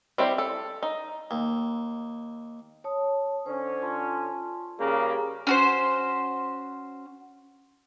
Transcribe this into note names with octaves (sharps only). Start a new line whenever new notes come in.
G3 C4 E4 C5
A4
D#4
D#2
C#5 A5 D#6
D3 C#4 C5
F4 A5 C6
C#3 G3 A#3 G4 G#4
C#4 F#4 C5